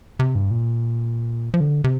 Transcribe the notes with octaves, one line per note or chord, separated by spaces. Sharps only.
C3
G2
A#2
F3
D3
C3